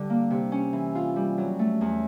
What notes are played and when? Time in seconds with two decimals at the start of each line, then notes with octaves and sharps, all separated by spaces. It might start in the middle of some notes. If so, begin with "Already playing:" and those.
Already playing: D3 G3 D4
0.10 A#3
0.30 C3
0.52 C#4
0.73 E3
0.95 F4
1.16 G3
1.38 F#3
1.59 A3
1.81 E2